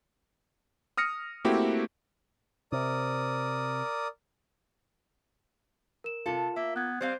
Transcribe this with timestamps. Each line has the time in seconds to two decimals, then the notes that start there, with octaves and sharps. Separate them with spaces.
0.97 D#6 F6 A#6 C#7
1.45 A3 A#3 C4 E4 F#4 G4
2.72 C3 A#4 D5 D#6
6.04 A#4 E7
6.26 C3 F4 A4
6.56 A#3 E5
6.76 B3 F#6 G#6
7.01 G3 C4 C5 F5